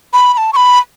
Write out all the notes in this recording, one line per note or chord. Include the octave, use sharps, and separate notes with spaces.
B5
B5
A5
C#6
B5